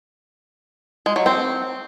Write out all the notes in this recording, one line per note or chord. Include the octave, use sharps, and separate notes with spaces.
G#3
F#3
C4